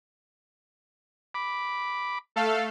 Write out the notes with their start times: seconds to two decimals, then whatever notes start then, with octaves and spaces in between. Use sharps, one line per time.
1.35 B5 D6
2.36 A3 A4 F5